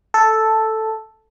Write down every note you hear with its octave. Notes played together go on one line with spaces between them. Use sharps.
A4